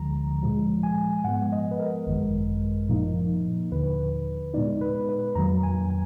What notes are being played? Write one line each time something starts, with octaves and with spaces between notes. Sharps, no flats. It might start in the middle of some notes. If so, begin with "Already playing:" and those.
Already playing: D2 D3 F3 G#3 A#5
A#2 F3 G#3
G#5
G#2 F3 G#3 B3 F#5
D#5
B4
A#4
G#1 F#2 D#3 G#3
A#2 F3 A#3 D#4
D#2 D3 F3 A#3 B4
A#2 G#3 B3 D#4 D5
B4
B4
F2 D#3 F#3 A#3 A#5
G#5
G#5